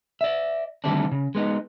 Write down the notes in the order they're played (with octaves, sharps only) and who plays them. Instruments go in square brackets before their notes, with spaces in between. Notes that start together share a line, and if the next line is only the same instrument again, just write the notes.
[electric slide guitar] D5 E5
D3 D#3 G3 A3 C4 D4
C#3
G#3 B3 D#4